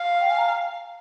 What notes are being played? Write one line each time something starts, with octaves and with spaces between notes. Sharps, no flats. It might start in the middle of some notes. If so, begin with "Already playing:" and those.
Already playing: F5
G5
G#5
A#5